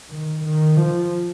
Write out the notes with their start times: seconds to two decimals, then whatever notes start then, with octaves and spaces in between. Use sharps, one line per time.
0.10 D#3
0.44 D#3
0.77 F3